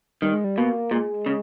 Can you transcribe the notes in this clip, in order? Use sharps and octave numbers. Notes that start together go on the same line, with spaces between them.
D#3 G3
G#3
G3
B2 A#3
A#2 G#3
C#3